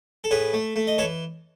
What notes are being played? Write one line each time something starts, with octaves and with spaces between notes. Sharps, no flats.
A4
A2 G#4 B4
A3
A3
D#5
E3 A4 C#5